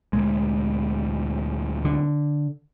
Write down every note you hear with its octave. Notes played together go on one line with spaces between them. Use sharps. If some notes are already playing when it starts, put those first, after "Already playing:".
D2 A#2 G#3
D3